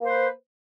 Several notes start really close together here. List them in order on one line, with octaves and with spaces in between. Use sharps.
A#3 C5 B4